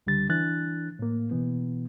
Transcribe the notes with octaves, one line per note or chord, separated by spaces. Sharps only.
C#2 D3 G3 A6
E3 D4 F#6 A6
A2 A#3
B2 E3 B3